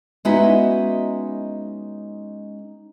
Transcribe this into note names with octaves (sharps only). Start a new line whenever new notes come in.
G#3 B3 C#4 D#4 E4 F#4